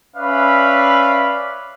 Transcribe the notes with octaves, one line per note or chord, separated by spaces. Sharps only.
C#4 B4 D5 E5 F5 B5